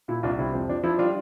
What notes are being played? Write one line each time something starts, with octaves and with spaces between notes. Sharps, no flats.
A#2 E4
C2 D4 F4
C3 E4
F2
F3 D4
F3 E4
G3 D4 F4